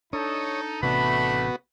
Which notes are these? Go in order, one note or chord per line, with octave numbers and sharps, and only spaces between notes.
D4 D#4 A4 C#5 D#6
A1 C3 A3 B3 D4 F#4 B5